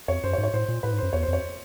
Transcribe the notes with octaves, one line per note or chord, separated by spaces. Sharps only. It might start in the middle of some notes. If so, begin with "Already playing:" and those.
F2 C#5
F#2 C5
C#5
G#2
C#5
A2 C5
A#2
A2 B4
G#2
F#2 C5
E2 C#5
C5
F2 C#5